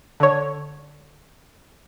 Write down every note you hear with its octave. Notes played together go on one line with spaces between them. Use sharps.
D3 C#5